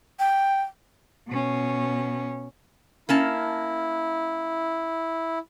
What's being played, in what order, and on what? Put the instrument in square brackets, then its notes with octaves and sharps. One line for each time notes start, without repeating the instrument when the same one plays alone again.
[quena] G5
[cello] B2 C#4
[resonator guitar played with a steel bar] A#3 C#4 A5 [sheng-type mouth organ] E4